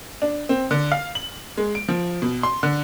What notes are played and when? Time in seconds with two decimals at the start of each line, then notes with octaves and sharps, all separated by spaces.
0.22 D4
0.49 C4
0.71 D3
0.92 F5
1.15 F#7
1.58 G#3
1.75 D7
1.88 F3
2.22 B2
2.43 C6
2.63 D3